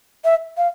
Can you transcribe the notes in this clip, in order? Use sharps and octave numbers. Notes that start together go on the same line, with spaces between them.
E5
F5